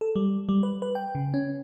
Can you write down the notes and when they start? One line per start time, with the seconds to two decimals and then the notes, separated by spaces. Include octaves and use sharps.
0.01 A4
0.16 G3
0.49 G3
0.63 B4
0.82 B4
0.95 G5
1.15 C#3
1.34 C#4